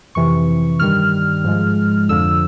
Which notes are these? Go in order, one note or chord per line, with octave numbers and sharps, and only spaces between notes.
F2 C3 E3 C#6
G2 D#3 G3 F6
G#2 F3 G#3
F2 D3 F3 E6